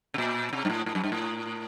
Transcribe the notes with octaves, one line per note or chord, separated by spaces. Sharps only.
C3
A#2
C3
G2
A2
A2
F#2
G2
A2